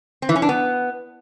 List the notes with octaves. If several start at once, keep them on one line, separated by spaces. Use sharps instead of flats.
C4
E3
C#4
D4
B3